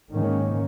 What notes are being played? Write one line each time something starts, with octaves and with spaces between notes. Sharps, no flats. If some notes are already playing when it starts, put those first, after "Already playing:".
G#2 D#3 A#3 C#4